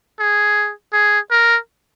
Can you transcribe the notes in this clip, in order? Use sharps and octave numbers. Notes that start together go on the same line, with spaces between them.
G#4
G#4
A#4